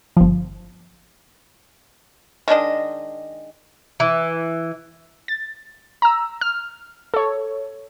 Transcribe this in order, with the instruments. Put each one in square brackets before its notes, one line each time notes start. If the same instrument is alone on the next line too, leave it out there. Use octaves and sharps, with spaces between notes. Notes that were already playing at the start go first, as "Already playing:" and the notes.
[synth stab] G1 F3
[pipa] D#3 G#3 D4 D#5
[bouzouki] E3
[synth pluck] A6
A#5 E6
F6
A4 C#5